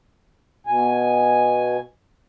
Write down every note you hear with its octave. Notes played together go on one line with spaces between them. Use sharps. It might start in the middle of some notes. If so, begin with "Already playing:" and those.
B2 G#5